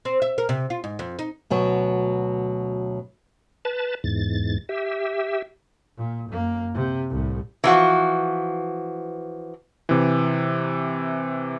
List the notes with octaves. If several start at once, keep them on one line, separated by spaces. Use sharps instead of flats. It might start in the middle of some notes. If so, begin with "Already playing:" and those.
C4
E5
A#4
C3
F4
G#2
F2
D#4
D2 B2 F#3
B4 A5
E2 G#2 A6
G4 E5
A#2
F#2 A#3
C3
C2 A2
E3 F3 F#4
C3 E3